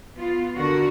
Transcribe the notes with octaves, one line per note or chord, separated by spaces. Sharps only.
B3 F4
D3 F#4 A#4